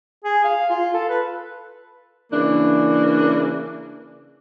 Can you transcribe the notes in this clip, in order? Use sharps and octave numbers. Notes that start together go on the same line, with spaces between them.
G#4
F5
F4
A4
B4
C#3 E3 A#3 D4